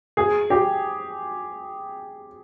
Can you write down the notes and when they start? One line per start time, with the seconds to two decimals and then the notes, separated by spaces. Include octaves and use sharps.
0.17 G#4
0.50 G4